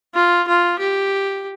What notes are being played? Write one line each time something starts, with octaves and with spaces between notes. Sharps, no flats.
F4
F4
G4